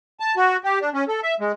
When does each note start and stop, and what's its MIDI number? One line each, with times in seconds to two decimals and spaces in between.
0.20 0.35 81
0.37 0.57 66
0.64 0.79 67
0.81 0.89 62
0.94 1.04 61
1.08 1.20 69
1.23 1.34 76
1.40 1.52 56